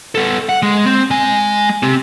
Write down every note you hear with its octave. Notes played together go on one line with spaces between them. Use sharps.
B3 A4
F#5
G#3
C4
G#3 G#5
C4 G4